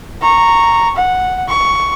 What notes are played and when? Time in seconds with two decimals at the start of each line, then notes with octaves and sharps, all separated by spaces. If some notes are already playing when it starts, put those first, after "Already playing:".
0.22 A#5 C#6
0.96 F#5
1.49 C#6